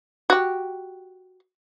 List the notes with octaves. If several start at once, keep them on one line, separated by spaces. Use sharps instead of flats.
F#4 G4